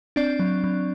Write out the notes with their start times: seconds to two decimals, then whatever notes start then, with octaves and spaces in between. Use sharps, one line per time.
0.16 C4 D4 D5
0.39 F#3
0.64 F#3